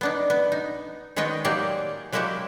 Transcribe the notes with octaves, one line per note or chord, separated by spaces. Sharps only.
B3 D4 D#4
B3
D#4
D#3 G#3 B3 C#5 D#5 G5
F#3 A#3 D#4 G4 G#4 D5
F#3 G#3 A#3 E4 F#4 G4